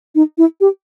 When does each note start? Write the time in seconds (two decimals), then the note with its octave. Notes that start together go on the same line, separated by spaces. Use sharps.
0.15 D#4
0.38 E4
0.61 G4